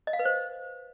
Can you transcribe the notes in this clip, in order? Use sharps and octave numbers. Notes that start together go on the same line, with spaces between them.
D#5
F5
B4
C5